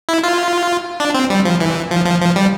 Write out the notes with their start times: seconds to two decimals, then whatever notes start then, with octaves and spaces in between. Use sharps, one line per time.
0.09 E4
0.23 F4
1.00 D4
1.15 C4
1.30 G3
1.45 F3
1.60 E3
1.91 F3
2.06 F3
2.21 F3
2.36 G3